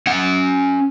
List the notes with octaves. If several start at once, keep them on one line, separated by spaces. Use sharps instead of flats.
C#4 F#5